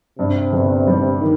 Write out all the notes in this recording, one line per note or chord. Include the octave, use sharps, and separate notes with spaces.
G2 C3
G1
G3
D#3